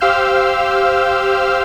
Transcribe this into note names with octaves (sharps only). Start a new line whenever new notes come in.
G4 C5 F5 E6 F6 G6